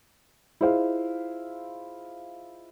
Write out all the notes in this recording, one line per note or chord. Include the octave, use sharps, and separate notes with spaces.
E4 F4 G#4 C5 D#5 F5